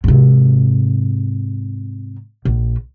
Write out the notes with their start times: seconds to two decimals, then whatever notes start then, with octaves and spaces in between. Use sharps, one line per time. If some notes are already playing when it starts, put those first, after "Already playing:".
0.04 G#2 C3
2.45 A#1